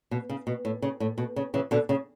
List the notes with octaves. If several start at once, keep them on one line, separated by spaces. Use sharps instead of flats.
B2
C#3
B2
A2
C#3
A2
B2
C#3
C#3 E3
B2 D3
C#3